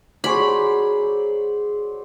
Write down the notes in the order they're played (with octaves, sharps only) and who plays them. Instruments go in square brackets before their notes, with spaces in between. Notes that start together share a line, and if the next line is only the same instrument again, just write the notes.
[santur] F#3 C5 D5 [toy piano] G4 G#5 D6 [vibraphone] G#4 [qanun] B5